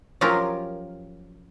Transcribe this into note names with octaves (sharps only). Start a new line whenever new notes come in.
F3 F#3 C#4 F4 G4 A#4